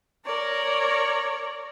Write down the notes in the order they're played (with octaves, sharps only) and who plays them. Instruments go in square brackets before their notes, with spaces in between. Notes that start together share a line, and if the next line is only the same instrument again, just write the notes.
[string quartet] A#4 C#5 D5